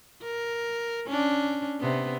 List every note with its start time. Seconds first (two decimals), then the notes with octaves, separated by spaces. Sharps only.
0.23 A#4
1.07 C#4 D4
1.80 C3 B3